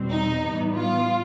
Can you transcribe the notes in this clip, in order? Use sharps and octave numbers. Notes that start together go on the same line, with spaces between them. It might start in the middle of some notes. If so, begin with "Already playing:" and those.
Already playing: E2 B2 G3 C4
D#4
A2 E3 G3 B3
F4